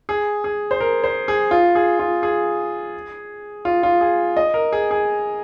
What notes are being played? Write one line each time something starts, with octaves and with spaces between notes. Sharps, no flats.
G#4
G#4
C5
A#4
C5
G#4
F4
G#4
F4
G#4
F4
F4
G#4
D#5
A#4
G#4
G#4